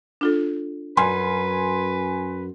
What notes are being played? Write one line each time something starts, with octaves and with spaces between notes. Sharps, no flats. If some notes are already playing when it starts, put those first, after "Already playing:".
D4 F4 A4
F#2 B4 G#5 C6